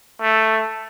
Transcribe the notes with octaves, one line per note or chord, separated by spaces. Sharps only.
A3